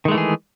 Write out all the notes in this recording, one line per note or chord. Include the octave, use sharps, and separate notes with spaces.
D#3 E3 G#3 A3 G#4